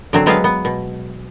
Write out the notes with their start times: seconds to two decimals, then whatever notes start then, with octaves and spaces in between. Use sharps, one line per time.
0.13 D3 F#3 C4
0.26 F#3 G#3 B3 C4 B4 F5
0.44 B3
0.65 B2